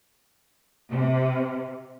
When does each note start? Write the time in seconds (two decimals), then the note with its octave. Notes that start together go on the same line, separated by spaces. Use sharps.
0.90 C3